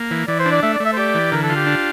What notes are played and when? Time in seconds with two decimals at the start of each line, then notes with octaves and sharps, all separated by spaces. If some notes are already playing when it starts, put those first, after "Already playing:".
Already playing: A#3
0.11 E3
0.28 E3 D5
0.39 C5
0.46 D4
0.52 D5
0.63 A3 E5
0.74 D5
0.80 A3
0.86 E5
0.93 C5
0.97 G4 D5
1.15 E3
1.32 D3 A#4
1.43 A4
1.50 F4
1.56 G4
1.66 D4